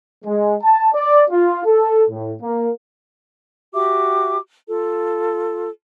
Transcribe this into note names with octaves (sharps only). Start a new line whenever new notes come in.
G#3
A5
D5
F4
A4
A2
A#3
F#4 G4 E5 D6
F4 A4